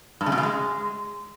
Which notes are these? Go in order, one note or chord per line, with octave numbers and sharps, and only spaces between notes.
G2
C#3
B2
C#3
G#3